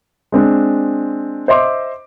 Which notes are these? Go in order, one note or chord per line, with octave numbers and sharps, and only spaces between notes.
G#3 C4 D4
C5 D#5 E5 C6 D6